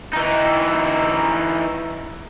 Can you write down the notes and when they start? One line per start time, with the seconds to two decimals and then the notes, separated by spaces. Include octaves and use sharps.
0.13 E3 D#4